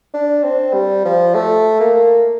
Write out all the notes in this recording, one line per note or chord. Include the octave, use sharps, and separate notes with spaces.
D4
C4
G3
F3
A3
A#3